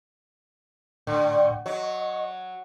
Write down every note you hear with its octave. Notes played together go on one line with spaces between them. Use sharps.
A2 D3 G5 C#6
F#3 D#5 C#6